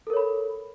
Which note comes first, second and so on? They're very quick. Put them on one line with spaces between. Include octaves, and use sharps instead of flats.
A4 A#4 C#5 B5